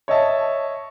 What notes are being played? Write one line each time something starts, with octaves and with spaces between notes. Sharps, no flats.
C#5 D#5 E5 A5